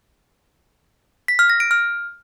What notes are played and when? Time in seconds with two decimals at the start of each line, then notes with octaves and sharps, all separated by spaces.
1.28 B6
1.39 F6
1.50 A#6
1.60 D7
1.71 F6